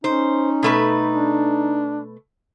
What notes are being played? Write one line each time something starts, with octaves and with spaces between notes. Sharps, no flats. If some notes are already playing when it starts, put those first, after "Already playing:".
C#4 D#4 C5
B2 A3 B4
D4